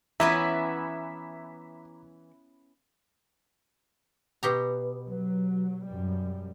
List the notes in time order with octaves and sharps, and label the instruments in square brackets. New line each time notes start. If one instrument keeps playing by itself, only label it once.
[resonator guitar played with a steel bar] E3 [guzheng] B3 C#4 B4 [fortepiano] E5 [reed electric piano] A#5 D6 G#6
[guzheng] B2 G4 A#5
[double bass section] F#3
F#2 G3